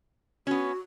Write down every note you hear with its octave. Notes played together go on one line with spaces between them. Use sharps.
B3 C#4 F#4